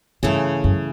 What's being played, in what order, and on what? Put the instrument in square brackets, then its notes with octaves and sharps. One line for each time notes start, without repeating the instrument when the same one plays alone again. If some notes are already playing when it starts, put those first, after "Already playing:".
[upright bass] G2 [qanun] C#3 E3 A3
[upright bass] F#2